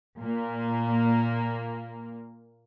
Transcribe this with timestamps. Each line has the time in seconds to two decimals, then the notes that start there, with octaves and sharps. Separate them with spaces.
0.19 A#2 A#3